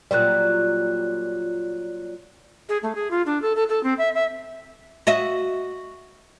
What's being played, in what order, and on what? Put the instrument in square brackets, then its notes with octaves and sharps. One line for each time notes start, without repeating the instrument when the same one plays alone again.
[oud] A#2 F#3 G3 [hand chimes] D5 F#6
[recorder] G#4
A3
G#4
F4
D4
A4
A4
A4
C4
E5
E5
[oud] F#4 D#5 E5